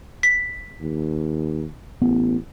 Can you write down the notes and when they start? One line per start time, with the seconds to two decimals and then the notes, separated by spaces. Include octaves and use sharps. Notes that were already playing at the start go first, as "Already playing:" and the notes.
0.23 B6
0.81 D#2
2.02 A1 B3